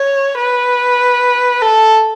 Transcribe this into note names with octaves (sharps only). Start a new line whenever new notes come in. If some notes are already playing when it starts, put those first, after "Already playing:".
Already playing: C#5
B4
A4